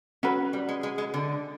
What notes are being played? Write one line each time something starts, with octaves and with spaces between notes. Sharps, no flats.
F#3 C#4 F#4 B4
G3
G#3
G#3
G#3
D3